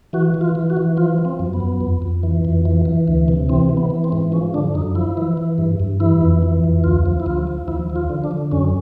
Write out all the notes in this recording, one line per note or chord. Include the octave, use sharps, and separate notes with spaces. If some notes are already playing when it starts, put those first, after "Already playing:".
E3 F#4
E3
F4
E3
F#4
E3
F3 F4
F3
C4
F#2
B3
F#2
F2
F2
E3
F2
E3
E3
D2
C3
E3 C4
E3
B3
E3
C4
G#2
F3 C#4
D3 D4
F#2 D#4
F3 E4
E3
E3
G2
G2
E3 E4
F2
E3
F2
D2 F4
F3
E4
D2 F4
F3
D#2 E4
F3
F4
D3
D4
D3
F#2 C#4